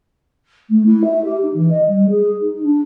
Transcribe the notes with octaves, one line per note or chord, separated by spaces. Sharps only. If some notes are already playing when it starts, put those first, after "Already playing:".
A3
E4
E5
G4
D#4
E3
D#5
G3
G#4
D#4
D4